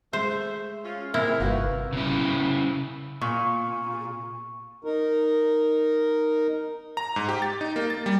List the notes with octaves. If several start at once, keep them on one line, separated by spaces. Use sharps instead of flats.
G#3 A3 C5 E5
C#4 F4
C3 G#3 A#3 E4 A#4
G1 D#4 F4 F#4 B4 F5
C#3 E4
A#2 C#6
D#4 A#4
A#5
G#2
G4
A6
D#4
A#3
A6
G3